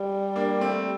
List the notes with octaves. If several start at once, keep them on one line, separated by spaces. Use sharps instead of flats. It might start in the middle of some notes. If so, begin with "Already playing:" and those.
Already playing: G3
A#3 D4
A3 C4